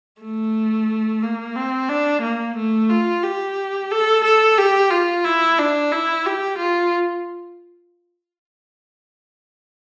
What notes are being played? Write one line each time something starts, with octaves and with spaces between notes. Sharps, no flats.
A3
A#3
C4
D4
A#3
A3
F4
G4
A4
A4
G4
F4
E4
D4
E4
G4
F4